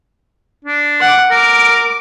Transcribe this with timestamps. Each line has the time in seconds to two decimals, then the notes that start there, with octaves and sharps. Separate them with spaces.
0.65 D4
1.01 F#5 D6
1.31 A#4 D6